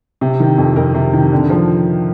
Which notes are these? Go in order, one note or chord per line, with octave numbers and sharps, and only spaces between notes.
C3
D#3
F2
F2 A#4
C3
D#3
D3
F3